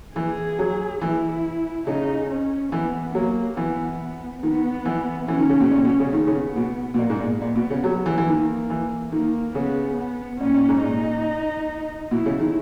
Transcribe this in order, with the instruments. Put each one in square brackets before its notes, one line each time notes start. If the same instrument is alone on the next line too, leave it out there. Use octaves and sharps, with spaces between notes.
[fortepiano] E3 [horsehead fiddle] G#4
[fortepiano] F#3
[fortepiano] E3 [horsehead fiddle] E4
[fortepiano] C#3 [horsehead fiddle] D#4
[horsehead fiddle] C#4
[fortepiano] E3 [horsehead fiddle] B3
[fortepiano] F#3 [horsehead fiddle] A#3
[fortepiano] E3 [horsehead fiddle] B3
[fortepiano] D#3 [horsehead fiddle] B3
[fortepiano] E3
[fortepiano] E3 [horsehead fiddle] C#4
[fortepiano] D#3
C#3
B2
A#2
B2
C#3
[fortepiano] D#3 [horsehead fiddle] B3
[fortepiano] C#3
B2
B2
[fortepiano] A#2 [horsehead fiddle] A#3
[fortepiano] G#2
A#2
[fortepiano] A#2 [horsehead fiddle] B3
[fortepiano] B2
C#3
F#3
E3
E3
[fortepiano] D#3 [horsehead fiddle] A#3
[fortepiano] E3
[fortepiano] D#3 [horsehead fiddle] A#3
[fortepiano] C#3 [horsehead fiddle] B3
[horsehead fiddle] B3
[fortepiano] A#2 [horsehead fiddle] C#4
[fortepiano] A#2
G#2
[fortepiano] A#2 [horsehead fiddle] D#4
[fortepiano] B2 [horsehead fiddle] E4
[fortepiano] C#3
D#3